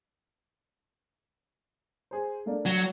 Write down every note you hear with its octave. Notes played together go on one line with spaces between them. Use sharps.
G#4 C5
A3 A#3 D4
F#3